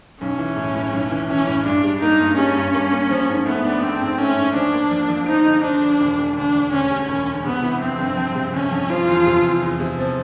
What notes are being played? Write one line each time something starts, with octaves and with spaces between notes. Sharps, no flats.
B1 C#4
E3
A2
A2
B1
E3
E3 C#4
A2
G2 D4
G3
A#3 D#4
G2
G3 C#4
G2
A#3
A#3
F3
G#2
A3 B3
D4
C4 D4
G#2
A3 C#4
G#2
F3 D4
A#3
F2
F2
F3 D#4
D3
F3 D4
D3
E1
E1
D2 D4
D2
D2 C#4
G3
E1 C#4
D3
C3 B3
E3
F2 C4
G1
F2
C3
G1 C#4
F2
F3 F4
E2
C3
E2
E2
C3
F3